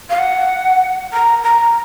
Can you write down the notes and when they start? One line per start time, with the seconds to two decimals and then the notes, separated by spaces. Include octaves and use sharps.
0.10 F5
0.19 F#5
1.13 A#5
1.44 A#5